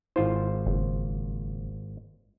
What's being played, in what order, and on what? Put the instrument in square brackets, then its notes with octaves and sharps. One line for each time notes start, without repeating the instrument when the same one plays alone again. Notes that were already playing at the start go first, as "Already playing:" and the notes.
[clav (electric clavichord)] G#1 F4 C5 [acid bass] E4
[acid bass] F#1